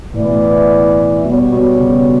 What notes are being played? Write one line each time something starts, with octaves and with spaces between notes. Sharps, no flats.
A2 E3 B3 E4 B4 D5
B2
A2
B2 G3 B3 F#4 C#5
B2
C#3